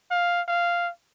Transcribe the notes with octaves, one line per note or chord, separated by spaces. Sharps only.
F5
F5